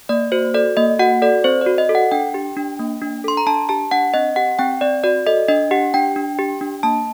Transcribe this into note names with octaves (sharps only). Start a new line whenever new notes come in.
A#3 D5
F#4 C5
A4 D5
A#3 D#5
F#4 F#5
A4 D5
C4 C5
D5
F#4
D#5
A4
F#5
D4 G5
G4
D4
A#3
D4
A4 C6
A#5
D4 A5
G4 A5
D4 F#5
C4 D#5
G4 F#5
C4 G5
C4 D5
F#4 D5
A4 D#5
D4 D#5
G4 F#5
D4 G5
D4
G4
D4
A#3 A5